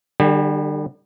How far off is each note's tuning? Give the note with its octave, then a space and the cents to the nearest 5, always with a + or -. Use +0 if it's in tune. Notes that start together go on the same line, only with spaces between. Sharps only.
D3 +45 G3 +0 G4 +45